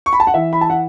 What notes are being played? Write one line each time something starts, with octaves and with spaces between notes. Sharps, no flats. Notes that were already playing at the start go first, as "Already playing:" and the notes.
C#6
B5
A5
F#5
E3 E5
B5
A5
F#5